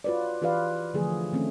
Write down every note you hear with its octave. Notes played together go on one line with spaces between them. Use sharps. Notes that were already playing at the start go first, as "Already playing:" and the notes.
F4 F#4 B4 C#5 D5
E3 F4 G4 B4 D5 F5
D3 E3 F3 A3 G#4
D#3 A3 C4 C#4